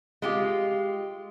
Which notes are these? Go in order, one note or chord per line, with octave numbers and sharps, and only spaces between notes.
G#3 F4 G4